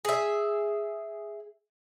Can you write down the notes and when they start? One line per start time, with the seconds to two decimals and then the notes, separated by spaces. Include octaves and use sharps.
0.05 G#4 E5